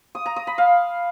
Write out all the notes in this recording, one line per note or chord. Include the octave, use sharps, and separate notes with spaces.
D#6
A#5
D#6
B5
F5